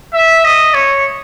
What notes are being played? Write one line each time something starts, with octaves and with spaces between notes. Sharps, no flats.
E5
D#5
C#5